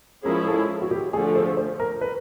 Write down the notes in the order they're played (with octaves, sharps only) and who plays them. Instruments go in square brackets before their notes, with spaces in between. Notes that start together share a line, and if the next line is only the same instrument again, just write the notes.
[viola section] F3 G#3 C#4 E4 G#4 [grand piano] A#4
[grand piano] A4
F#4
G4
[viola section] D3 F3 A3 [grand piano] G#4
[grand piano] C5
C5
A#4
B4